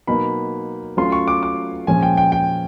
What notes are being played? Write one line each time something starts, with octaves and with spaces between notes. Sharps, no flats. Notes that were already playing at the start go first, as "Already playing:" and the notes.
B2 F#3 A#3 D#4 B5
F#3 A3 C#4 F4 C6
C#6
D6
D6
A#2 F3 G#3 C#4 G#5
G5
G5
G5